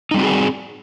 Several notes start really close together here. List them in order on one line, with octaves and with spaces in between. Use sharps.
D#4 G3 C4 F#4 G#4